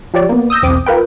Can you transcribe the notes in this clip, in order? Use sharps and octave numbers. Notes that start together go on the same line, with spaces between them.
F3 G4 C#5 D5
A#3 B3
D#6 E6 G6 A#6
B1 E2 C4 D6 D#6
F4 A#4 B4 G5